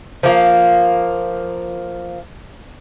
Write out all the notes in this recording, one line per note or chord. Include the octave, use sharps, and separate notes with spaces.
F3 A#3